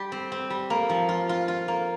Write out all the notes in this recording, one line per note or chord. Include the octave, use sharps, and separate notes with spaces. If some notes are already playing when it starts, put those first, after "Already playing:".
Already playing: G3 G4
C4
C4
G3
A#3
F3
F4
F4
F4
A#3